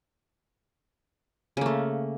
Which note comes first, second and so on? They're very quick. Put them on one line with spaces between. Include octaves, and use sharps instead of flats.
C#3 A#3 A3